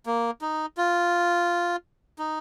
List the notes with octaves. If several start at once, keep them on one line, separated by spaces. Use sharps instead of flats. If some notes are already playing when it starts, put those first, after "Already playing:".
A#3
D#4
F4
D#4